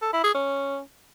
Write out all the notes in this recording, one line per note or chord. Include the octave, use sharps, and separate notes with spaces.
A4
E4
G#4
C#4